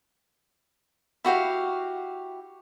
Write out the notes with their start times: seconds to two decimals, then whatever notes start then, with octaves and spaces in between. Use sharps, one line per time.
1.25 E4 F#4 G4 F5